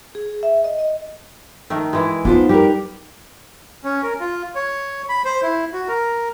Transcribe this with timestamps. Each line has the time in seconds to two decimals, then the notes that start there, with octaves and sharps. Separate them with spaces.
0.15 G#4
0.43 E5
0.64 D#5
0.79 D#5
1.70 D#3 A3 A#4
1.93 E3 G#3
2.25 B3 D4 D#4 F4 C5
2.49 G3 G4 A#4 B4
3.84 C#4
4.03 A#4
4.20 F4
4.55 C#5
5.09 B5
5.25 C5
5.43 E4
5.73 F#4
5.88 A#4